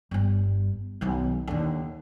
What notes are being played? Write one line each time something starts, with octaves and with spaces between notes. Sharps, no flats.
G1 G2
B1 D#3
D#2 D3